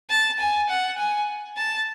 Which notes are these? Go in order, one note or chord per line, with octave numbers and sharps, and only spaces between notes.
A5
G#5
F#5
G#5
A5